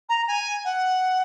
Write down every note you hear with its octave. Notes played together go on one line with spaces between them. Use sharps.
A#5
G#5
F#5